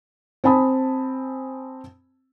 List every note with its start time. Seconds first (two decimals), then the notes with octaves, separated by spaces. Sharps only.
0.44 C4 G#5 A5 B5 D#6